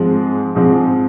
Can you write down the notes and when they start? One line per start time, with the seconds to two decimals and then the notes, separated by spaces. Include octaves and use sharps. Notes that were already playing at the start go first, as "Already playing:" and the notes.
Already playing: G#2 F3 G#3 C4
0.55 G#2 F3 G#3 C4